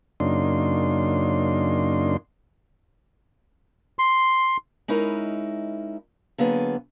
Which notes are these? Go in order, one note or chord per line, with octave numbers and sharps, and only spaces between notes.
F#2 C#3 A#3 D4 D#4 C6
C6
G#3 C#4 D#4 E4 A#4
D3 F#3 A#3 B3 G#4 B4